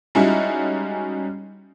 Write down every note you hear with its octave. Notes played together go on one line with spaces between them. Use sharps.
G3 G#3 C#4 D#4 E4 F#4